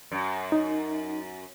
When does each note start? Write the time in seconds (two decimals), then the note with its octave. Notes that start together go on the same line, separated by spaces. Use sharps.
0.12 F#2
0.52 D#4